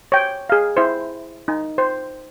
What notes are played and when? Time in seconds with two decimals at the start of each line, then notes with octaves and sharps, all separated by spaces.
0.12 C#5 G5
0.50 G#4 F5
0.77 E4 C5
1.48 D#4
1.78 C5